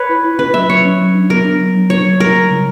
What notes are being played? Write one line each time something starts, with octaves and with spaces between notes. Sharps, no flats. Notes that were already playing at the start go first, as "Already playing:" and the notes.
Already playing: B4 C#5
E4
E4
C#4 B4
F#3 E5
F#3 C#5
C#4
F#3
D4
B3 A#4
D4
F#3
F#3
D4 C#5
F#3
G3 A#4
G3
C#3